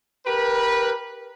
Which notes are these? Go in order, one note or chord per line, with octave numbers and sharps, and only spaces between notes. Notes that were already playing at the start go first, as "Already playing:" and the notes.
G4 A#4 B4